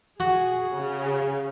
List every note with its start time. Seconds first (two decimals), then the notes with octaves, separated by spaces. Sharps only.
0.20 F#4 G#4
0.74 C#3